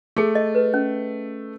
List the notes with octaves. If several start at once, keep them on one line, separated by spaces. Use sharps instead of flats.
A3 G#4
D#5
B4
C#4